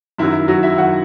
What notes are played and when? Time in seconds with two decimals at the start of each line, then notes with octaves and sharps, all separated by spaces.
0.18 F#2 D#3 F#3 E4
0.33 E4
0.48 F#3 F#4
0.63 E4 E5
0.78 D#3 F#3 F#4 F#5